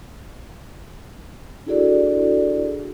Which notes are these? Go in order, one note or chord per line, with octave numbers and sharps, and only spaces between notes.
D4 E4 F#4 G#4 A4 D5